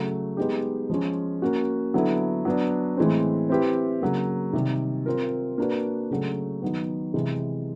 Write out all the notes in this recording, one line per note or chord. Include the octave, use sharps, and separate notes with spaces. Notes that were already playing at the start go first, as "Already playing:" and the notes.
Already playing: C#3 F#3 A3
G#3 B3 D#4 G4
F3 G#3 C#4
A#3 C#4 F#4
D3 F#3 B3 E4 A4
F#3 B3 D4
A2 E3 G#3 C4
C4 E4 G4 B4 E5
C#3 F#3 A#3
C3 D#3 G3
C4 F4 A#4
A#3 D4 F#4 B4
C#3 F#3 A3
D#3 F#3 B3
C3 E3 G#3